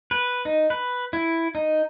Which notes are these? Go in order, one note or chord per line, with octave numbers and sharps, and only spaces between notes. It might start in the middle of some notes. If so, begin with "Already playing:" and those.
B4
D#4
B4
E4
D#4